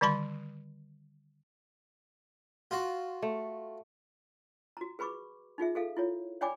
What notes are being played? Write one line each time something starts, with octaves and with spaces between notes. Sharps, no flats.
D3 D#3 G3 A5 B5 C6
F4 F#4
A3
F#4 A#5
G#4 B4 B5 C#6 D6
D#4 F4 G#4 E5
G#4 A4 F5
E4 F4 C#5
C#5 D5 G5 G#5 B5 D6